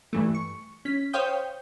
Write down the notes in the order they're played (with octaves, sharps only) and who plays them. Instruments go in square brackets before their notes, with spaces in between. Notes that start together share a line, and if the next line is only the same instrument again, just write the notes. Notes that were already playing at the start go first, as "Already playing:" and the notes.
[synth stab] G2 E3 A3
C#6
C#4 B6
C5 C#5 F5 G5 D#6 G6